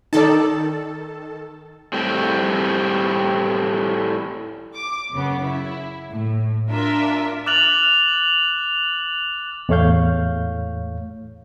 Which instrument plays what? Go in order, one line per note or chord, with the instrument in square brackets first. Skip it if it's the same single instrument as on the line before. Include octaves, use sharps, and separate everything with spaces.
[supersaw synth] D#3 A4 A5 [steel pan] D#4 D5
[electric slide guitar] A2 G3 C4
[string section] D6
F#2 C#3 B3
E4
A2
D4 F4 A#4 E5
[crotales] D6 F6 F#6 A6 F7 F#7
[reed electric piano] E2 A2 A3 C#5 F5 G6